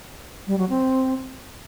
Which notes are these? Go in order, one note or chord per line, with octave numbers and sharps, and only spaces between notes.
G3
F#3
C4